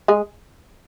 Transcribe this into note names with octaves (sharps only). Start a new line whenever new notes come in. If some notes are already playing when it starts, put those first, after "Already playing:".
G#3 G#4